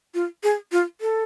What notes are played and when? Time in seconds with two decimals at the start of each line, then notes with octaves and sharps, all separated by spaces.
0.14 F4
0.43 G#4
0.72 F4
1.01 A4